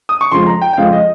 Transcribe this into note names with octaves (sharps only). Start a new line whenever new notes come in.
D#6
C#6
F2 C#3 F3 G#3 C6
A#5
G5
G5
F2 C#3 F3 G#3 F5
D#5